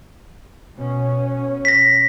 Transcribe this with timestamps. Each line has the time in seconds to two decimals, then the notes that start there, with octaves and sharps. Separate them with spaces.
0.78 B2 C#4
1.65 A#6 B6